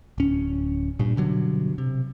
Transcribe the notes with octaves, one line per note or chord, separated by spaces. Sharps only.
D1 C#4
G2 A#2
G2 B2 D3 F#3
C3